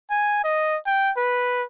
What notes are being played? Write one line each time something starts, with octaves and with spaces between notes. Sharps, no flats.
G#5
D#5
G5
B4